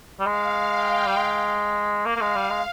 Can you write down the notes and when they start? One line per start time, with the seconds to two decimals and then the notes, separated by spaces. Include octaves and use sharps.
0.20 G3
0.26 G#3 F5
0.71 G5
1.07 G3
1.16 G#3
2.05 A#3 F5
2.16 A#3
2.21 G#3
2.36 G3
2.51 G#3